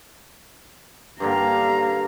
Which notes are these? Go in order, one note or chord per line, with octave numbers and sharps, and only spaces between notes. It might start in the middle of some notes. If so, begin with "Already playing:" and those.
G2 D3 A#3 F5 A#5